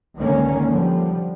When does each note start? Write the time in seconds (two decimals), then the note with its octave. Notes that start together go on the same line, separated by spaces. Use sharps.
0.17 C#2 D3 D#3 A#3 C#4
0.67 D3 F3 G3